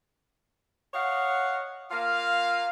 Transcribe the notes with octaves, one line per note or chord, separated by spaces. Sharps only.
C#5 D#5 F5 F#5
A#3 F4 F5